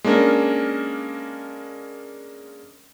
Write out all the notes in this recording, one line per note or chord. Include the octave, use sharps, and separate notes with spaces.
G#3 A#3 C#4 D4 A#4